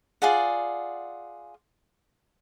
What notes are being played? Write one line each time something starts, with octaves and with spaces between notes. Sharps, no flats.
F4 G#4 D5 F#5